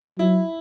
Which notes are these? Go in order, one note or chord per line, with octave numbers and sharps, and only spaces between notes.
F#3 E4